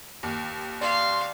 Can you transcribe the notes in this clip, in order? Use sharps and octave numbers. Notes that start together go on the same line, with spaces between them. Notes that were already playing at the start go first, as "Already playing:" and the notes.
D#2
D5 F5 C6